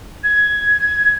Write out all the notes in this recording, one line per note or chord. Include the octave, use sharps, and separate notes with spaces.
G#6